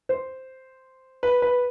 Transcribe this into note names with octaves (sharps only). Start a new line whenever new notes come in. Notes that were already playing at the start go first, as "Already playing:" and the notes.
C5
B4
B4